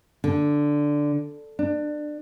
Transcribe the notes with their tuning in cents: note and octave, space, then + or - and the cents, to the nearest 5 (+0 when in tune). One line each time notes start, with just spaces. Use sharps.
D3 +0
D4 +25